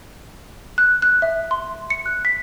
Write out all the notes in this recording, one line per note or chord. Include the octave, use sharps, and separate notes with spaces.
F#6
F#6
E5
C6
C#7
F#6
B6